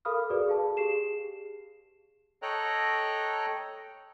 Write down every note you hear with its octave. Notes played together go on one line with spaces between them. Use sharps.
A4 A#4 F5 B5 D#6 F6
F#4 G#4 A4 B4 D5
G#4 F5 A5
G4 G#4 C7 E7
A4 C#5 D#5 G5 A#5 F#6